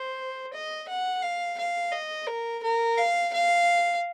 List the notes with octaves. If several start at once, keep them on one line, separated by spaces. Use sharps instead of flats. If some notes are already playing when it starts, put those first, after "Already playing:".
Already playing: C5
D#5
F#5
F5
F5
D#5
A#4
A#4
F5
F5